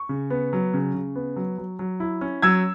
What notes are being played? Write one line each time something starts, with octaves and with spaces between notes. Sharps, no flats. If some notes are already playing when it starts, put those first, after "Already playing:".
Already playing: C#6
C#3
B3
F#3
C#3
C#3
B3
F#3
F#3
F#3
E4
C#4
F#3 E6 G#6